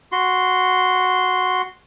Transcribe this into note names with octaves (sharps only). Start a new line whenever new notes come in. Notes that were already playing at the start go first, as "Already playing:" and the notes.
F#4 C6